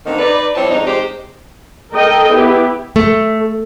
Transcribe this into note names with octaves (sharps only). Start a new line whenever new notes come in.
D2 D3 D#3 A#3 C4 D#4
D#4 B4 D5
F3 G3 C4 D4 E4 C#5
F2 G#2 D4 D#4
C3 G#3 D#4 G4 C5
A4 A#4 D#5 G5
B3 E4 G4
A3